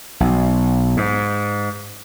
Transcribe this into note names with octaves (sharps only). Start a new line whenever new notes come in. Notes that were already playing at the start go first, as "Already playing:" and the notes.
B1
G#2